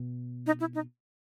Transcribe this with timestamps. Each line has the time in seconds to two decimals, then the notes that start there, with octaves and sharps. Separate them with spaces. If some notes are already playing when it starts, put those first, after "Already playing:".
Already playing: B2
0.47 D#4
0.60 E4
0.74 D#4